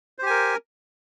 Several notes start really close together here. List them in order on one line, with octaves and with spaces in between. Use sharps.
C5 G4 G#5 A#4